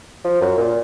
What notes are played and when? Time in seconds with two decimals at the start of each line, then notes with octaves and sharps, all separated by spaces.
0.24 F3
0.41 F#2
0.57 A#2